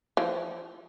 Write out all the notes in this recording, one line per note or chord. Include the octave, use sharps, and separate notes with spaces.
E3 F3